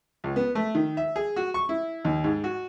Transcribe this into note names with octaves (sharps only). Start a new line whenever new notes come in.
C#2
B3
A3
D#3
E5
G#4
F#4
C#6
E4
D#2
G#2
F#4